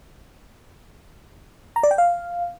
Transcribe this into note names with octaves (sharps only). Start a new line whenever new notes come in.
A#5
D5
G5
F5